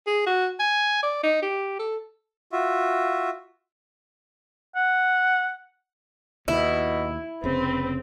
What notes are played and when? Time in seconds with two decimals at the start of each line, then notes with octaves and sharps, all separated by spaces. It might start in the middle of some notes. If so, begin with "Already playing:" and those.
0.07 G#4
0.27 F#4
0.60 G#5
1.03 D5
1.24 D#4
1.43 G4
1.79 A4
2.52 F4 F#4 E5
4.76 F#5
6.48 D#2 B2 E4
7.44 F1 C#3 C4 B4